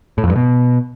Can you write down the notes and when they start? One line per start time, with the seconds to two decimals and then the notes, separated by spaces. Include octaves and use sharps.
0.18 A2
0.24 F2
0.30 G2
0.36 B2